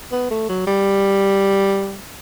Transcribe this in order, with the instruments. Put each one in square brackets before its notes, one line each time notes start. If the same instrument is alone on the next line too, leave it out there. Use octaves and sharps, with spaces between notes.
[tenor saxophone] B3
A3
F#3
G3